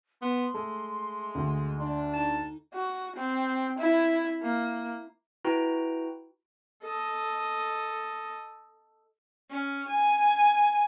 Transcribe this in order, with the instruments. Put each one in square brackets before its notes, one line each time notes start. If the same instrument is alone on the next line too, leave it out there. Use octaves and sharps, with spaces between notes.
[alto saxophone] B3 [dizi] C6
[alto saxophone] G#3 [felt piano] A3
[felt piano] D2
[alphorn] D4 [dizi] C6
[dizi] D#4 [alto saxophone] A5
[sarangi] F#4
C4
E4
A#3
[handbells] E4 F#4 B4 G5 A#5
[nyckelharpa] A4 D#5
[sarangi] C#4
G#5